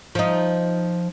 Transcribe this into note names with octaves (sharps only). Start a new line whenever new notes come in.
F3 D#4